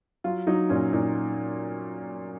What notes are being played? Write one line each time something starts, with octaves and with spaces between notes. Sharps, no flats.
F#3 F4
F#3 D#4
A#2 C#4
A#2 D#4